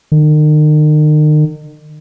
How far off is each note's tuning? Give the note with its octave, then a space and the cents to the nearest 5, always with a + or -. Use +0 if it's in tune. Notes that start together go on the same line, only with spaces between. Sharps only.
D#3 -40